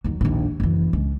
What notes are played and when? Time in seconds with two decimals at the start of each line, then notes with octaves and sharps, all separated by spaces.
0.04 D#2 F#3
0.21 A#1 D#2
0.60 F#1 E3
0.93 C#2